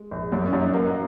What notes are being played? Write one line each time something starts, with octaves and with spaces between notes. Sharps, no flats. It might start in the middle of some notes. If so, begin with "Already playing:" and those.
Already playing: G#3
A#1
F#2 A#3
C#4
F#2
D#4
A#3 F#4